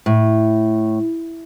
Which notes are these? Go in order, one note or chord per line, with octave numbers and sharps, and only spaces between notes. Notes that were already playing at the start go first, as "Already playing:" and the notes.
A2